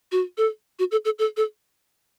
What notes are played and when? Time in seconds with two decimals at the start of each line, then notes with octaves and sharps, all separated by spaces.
0.12 F#4
0.37 A4
0.79 F#4
0.91 A4
1.05 A4
1.19 A4
1.37 A4